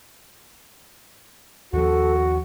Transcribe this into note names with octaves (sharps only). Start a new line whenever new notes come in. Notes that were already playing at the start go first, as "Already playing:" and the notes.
D#2 F3 F#4 A4